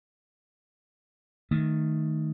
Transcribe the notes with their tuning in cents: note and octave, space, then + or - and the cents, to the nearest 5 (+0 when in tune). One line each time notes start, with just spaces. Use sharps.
D#3 +0 A3 +0